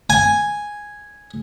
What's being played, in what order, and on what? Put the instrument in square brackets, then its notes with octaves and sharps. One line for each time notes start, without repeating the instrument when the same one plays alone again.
[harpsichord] G#5